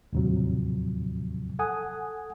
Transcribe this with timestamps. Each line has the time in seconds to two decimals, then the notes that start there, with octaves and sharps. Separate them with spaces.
0.13 D#2 A2 C3 F3 F#3
1.59 A4 F#5 G#5 D#6